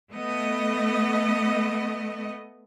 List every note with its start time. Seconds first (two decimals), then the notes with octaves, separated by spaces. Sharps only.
0.11 A3 B3 D#5